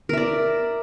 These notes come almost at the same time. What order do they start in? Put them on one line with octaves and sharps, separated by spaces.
A#4 E5 D5